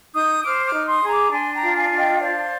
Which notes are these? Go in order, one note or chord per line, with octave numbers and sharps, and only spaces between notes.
D#4 D#6 G6
C5 D6 F6
D6 F6
D#4
C6 D#6
G#4
A#5 D6
D4 G#5 C6
G5 A#5
F4
F5 G#5
D4
D#5 G5
C5 D5 F5